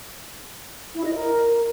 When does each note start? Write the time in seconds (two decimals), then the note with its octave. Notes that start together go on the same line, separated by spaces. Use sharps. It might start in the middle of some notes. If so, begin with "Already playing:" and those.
0.95 E4
1.04 D#5
1.14 A#4